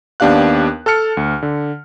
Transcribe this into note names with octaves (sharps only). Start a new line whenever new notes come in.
D#2 B3 D4 G4 F5 F#6
A4 A5 F6 C#7
D2
D3